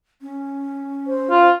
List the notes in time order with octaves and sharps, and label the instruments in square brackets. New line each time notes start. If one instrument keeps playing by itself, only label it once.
[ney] C#4
[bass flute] C5
[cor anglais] F4